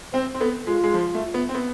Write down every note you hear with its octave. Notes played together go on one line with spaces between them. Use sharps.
C4 C5
C4
B3 A4
G#3 F4
G#3
F3
A3
B3
C4
B3